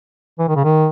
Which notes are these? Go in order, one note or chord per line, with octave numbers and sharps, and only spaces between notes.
E3
D#3
C#3
D#3